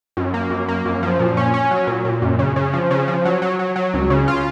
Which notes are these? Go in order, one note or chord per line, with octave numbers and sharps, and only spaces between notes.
F#2
A#3
F#2
A#3
F#2
F3
A#2
C#4
C#4
F#3
A#2
A#2
F#2
C#3
C#3
F3
C#3
F3
F#3
F#3
F#3
F#3
C#2
C#3
F4